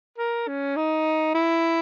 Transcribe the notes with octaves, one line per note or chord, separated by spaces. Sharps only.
A#4
C#4
D#4
E4